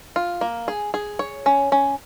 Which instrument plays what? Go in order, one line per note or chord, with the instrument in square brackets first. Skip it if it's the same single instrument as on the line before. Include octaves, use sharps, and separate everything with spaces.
[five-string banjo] F4
A#3
G#4
G#4
C#5
C#4
C#4